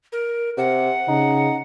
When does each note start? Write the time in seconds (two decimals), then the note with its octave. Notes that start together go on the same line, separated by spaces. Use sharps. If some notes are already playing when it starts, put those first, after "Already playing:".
0.12 A#4
0.57 C3 F#5
1.08 C#3 D#4